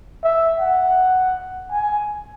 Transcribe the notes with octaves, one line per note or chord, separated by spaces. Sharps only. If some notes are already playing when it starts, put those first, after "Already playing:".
E5
F#5
G#5